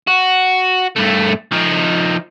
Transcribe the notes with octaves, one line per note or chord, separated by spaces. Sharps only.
F#4
G2 A3
F3 D#4